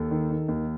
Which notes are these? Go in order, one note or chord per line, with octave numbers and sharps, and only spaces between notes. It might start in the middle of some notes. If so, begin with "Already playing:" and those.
Already playing: D#2 A4
D#3
D#3
D#2